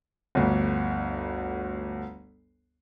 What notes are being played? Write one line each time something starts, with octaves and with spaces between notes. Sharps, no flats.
G1 D2